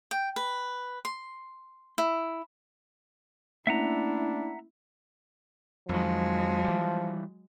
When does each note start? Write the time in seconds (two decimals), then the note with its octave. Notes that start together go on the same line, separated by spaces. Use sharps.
0.11 G5
0.36 B4
1.05 C6
1.98 E4
3.67 A3 A#3 C#4 D4 E4 E5 F#5 A#5
5.89 F2 D#3 F3 F#3 G#3
6.64 E3 G3